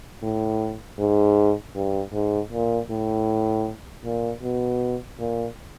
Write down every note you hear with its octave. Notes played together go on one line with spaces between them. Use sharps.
A2
G#2
G2
G#2
A#2
A2
A#2
B2
A#2